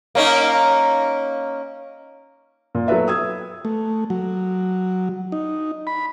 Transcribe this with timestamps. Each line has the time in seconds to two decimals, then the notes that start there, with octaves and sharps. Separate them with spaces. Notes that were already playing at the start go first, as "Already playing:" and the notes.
0.15 A#3 C#4 D#4
2.75 A#2
2.88 F#3 B3 A4 B4 E5
3.08 D#6 E6 G#6
3.65 A3
4.10 F#3
5.32 D#4
5.87 B5